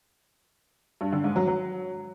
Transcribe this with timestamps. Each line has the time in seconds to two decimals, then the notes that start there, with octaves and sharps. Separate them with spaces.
1.01 G2
1.12 D3
1.24 G#2
1.36 F#3
1.47 F#3